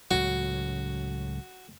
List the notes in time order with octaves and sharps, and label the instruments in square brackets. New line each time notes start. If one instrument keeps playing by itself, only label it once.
[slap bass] C#2 A2 F#3 [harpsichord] F#4